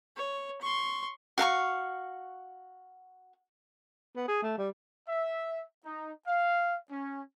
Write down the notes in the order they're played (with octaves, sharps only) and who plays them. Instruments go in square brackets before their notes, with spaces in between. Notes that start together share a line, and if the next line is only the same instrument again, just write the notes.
[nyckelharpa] C#5
C6 C#6
[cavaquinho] F#4 F5 A5 C#6
[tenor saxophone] B3
G#4
A3
G3
[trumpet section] E5
D#4
F5
C#4